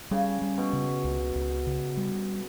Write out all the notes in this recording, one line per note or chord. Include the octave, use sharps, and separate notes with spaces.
C#3 G3
G3
B2
C#3
C#2
C#2
C#3
G3